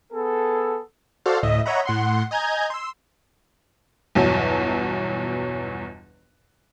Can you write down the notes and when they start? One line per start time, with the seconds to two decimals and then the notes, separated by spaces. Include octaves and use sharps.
0.13 B3 G#4 A4
1.26 F#4 A4 C5 D5 F5
1.43 D2 A2 D#5 E5
1.66 C#5 D#5 E5 F#5 A#5 B5
1.85 A2 F#5 C6
2.31 D#5 G#5 A#5 G6 G#6
2.70 C6 E6
4.15 G1 E2 B2 F#3